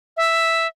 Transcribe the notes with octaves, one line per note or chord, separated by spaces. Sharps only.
E5